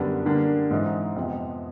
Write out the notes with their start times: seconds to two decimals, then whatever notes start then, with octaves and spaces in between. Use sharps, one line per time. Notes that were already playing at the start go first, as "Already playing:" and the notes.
Already playing: F#2 D3 G3 B3 D4
0.25 D3 G3 A#3 D4
0.71 G#2 E3 G#3 C4 D#4
1.16 F2 C3 F3 G#3 B3